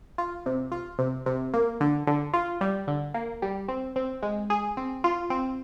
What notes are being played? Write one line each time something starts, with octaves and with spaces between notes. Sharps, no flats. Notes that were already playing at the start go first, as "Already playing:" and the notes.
F4
C3
F4
C3
C3
A#3
D3
D3
F4
G3
D3
A#3
G3
C4
C4
G#3
G#4
C4
F4
C4